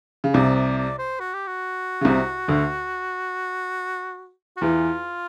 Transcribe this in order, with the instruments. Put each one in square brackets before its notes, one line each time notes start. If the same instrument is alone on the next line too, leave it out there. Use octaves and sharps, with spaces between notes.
[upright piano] C#3
[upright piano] C2 C3 [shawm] D5
[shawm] D5
D5
C5
F#4
G4
F#4
[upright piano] C#3
C2 C3
D2 D3
[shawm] F#4
[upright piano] E2 E3 [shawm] F4